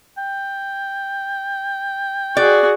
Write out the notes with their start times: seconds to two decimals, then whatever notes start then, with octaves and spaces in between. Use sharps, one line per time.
0.18 G5
2.37 F#4 G#4 D5